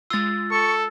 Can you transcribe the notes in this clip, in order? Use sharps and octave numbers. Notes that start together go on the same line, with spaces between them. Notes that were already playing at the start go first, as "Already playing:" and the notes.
G#3 F4 E6 A6
A4 C#6